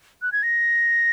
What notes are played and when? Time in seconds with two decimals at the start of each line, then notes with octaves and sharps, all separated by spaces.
0.22 F#6
0.32 G#6
0.43 A#6